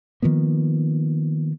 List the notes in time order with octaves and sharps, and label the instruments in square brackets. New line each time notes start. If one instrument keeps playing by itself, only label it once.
[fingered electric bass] D#3 F3 A#3 B3